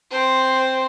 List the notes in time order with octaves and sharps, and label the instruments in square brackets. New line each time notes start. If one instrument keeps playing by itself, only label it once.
[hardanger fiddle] C4 C5